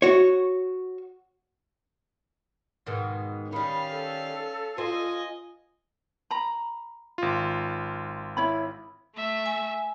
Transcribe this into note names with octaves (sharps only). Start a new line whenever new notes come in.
F#4 C#5
G#2 B2 D#3
D#3 G3 C#4 F5 B5
A4
F4 C5 D#5 G#5
A#5 B5
G#1 F4
E4 C#5 B5
A3 E5
G#5